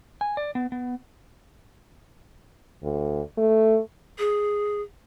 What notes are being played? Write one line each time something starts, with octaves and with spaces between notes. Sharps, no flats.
G#5
D5
B3
B3
D2
A3
G#4